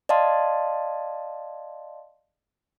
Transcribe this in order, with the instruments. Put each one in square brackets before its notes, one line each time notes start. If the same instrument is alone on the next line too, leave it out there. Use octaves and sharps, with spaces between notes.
[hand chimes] D5 D#5 F5 A5 C6